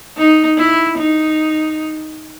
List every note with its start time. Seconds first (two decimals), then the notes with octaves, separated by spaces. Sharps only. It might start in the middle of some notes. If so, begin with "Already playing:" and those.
0.18 D#4
0.58 E4
0.98 D#4